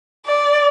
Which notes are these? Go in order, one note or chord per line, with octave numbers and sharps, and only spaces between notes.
D5